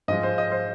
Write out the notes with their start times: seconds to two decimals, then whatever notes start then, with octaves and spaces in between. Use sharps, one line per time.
0.08 G#2 F3 G#3 D#5
0.23 C5
0.38 D#5
0.52 C5